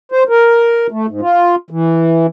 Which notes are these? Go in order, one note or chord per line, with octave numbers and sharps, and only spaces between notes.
C5
A#4
A3
G#2
F4
E3